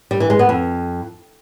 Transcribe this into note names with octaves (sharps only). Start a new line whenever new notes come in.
G3
E3
G#3
B3
F2